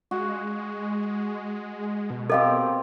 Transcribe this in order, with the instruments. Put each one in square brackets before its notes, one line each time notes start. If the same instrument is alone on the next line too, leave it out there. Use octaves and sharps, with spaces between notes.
[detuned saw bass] G#3 [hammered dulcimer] F#4
[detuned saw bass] B2
[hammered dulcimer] C4 G4 A#4 [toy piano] A4 D#5 F5